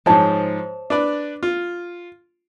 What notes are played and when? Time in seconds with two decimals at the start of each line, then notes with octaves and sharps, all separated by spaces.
0.06 G#2 F3 C5 C#5 A5
0.90 D4 B4 D5
1.43 F4